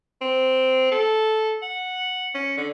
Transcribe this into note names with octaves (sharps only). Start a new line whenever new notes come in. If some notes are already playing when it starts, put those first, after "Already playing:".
C4
A4
F#5
C#4
D3